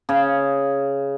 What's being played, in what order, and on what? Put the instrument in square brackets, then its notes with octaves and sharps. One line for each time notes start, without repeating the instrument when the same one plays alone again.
[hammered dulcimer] C#3